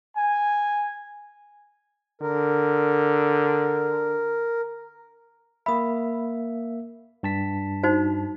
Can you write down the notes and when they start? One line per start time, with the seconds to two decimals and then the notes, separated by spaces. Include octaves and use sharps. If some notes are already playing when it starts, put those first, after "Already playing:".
0.17 G#5
2.21 D3 A#4
5.66 A#3 E5 B5 D#6
7.23 G2 A5 B6
7.83 D#4 F#4 C5